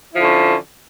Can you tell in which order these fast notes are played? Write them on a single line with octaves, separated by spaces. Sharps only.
E4 F3 D3 C#4